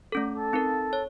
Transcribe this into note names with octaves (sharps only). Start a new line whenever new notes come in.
A3 C#4 A4
A4
C4 D#4 A#4
C#5